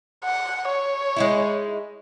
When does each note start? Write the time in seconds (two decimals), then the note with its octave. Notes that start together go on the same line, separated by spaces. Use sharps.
0.25 F#5
0.69 C#5
1.16 G#3 D#4 E4